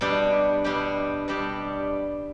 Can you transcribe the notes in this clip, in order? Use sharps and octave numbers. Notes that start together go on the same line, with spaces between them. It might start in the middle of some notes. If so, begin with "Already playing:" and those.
B2 G3 D4 G4
B2 G3 D4 G4
B2 G3 D4 G4